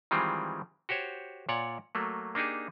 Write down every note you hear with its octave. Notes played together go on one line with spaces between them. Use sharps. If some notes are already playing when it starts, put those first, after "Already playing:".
D#3 E3 G3 G#3 C4 F4
F#4 G4 C5 C#5
A#2 C#5 D5 F#5
F#3 A3 A#3
A#3 D4 D#4 G4 G#4